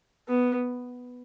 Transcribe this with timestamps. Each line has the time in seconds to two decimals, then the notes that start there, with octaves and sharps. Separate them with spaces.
0.28 B3